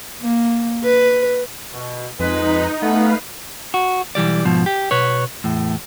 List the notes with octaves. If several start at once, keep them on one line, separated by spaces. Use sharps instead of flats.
A#3
B4
B2
F2 G#3 D#4 B4
A3 B3 B4 F5
F#4
B1 E3 G3 D5
G#2 B2 F3
G4
B2 B4 C#5
E2 A2